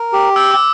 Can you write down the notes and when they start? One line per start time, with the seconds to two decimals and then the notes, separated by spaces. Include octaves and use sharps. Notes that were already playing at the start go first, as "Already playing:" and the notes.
Already playing: A#4
0.13 G4
0.36 G5 E6
0.51 D6